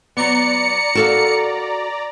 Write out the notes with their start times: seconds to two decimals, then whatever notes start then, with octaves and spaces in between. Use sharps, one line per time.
0.17 F#3 B3 D5 A#5 C#7
0.95 F#4 A4 A#4 F5